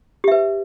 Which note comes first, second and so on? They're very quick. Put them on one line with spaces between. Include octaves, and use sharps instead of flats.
G4 E5 B4